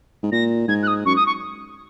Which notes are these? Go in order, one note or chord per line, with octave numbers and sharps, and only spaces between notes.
G#2
A#2 A#6
G#2 G#6
F#6
D#6
F#2 C#6
D#6
C#6